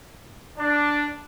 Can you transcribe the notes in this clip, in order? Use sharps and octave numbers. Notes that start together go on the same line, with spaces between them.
D4